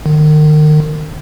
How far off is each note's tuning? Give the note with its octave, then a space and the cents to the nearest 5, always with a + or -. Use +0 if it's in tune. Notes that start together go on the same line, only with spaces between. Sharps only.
D#3 -35